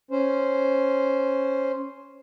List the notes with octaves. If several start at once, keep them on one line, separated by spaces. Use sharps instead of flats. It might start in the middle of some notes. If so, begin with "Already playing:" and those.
C#4 C5